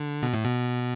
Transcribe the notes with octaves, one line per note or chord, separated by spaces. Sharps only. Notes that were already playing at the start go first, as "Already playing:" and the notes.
Already playing: D3
B2
A2
B2